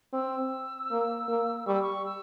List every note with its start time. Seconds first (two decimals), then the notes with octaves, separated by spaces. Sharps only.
0.13 C4 E6
0.91 A#3
1.28 A#3
1.67 G3 C#6
1.74 E6
1.82 C#6
2.05 E6